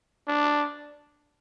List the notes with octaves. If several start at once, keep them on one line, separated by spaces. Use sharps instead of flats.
D4